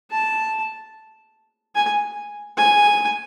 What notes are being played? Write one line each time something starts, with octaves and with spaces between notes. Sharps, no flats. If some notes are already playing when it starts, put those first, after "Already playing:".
A5
G#5
G#5